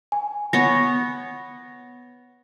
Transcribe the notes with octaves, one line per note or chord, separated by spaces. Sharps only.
G#5
B3 C#5 A#6